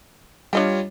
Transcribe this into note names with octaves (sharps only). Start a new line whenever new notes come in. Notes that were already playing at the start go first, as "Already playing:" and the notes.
G3 D4 F4 C#5 D#5 G5